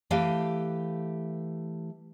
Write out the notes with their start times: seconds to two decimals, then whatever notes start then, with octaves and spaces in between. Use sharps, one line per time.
0.10 E3 A3 G4 F5 G#5